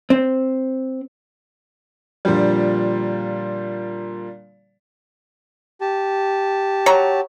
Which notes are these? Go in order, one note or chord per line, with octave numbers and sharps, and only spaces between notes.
C4
A#2 D3 F3 G3
G4 A5
F#3 C#5 A#5